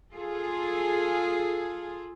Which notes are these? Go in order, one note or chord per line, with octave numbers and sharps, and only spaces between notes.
F4 G#4 A4